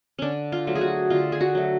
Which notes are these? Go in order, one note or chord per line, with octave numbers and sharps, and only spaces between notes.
D3 C#4 D4
F4
F#3 A3
G#4
F#4
D3 F4
G#4
F#4
F#3 A3